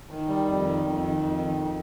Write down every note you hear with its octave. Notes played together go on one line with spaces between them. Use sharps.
D#3
G3
F2
D#3
F2
D#3
F2
D#3
F2